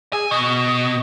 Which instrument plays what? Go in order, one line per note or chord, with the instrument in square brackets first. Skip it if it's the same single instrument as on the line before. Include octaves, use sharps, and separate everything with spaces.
[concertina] G#4 E6 [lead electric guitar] G#5
[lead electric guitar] B2 [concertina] D#5 C#6